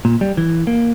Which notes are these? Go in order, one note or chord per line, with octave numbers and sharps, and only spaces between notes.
A#2
G3
E3
A#3